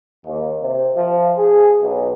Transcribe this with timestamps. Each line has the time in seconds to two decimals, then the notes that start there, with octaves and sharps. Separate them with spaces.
0.25 D#2
0.59 C3
0.95 F3
1.37 G#4
1.80 B1